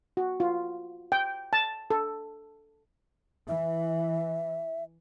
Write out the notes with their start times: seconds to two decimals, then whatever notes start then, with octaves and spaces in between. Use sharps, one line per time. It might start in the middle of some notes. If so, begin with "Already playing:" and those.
0.17 F#4
0.40 F4
1.12 G5
1.53 A5
1.90 A4
3.48 E3 E5